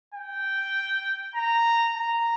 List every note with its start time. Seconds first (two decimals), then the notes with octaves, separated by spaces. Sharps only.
0.14 G5
1.35 A#5
1.95 A#5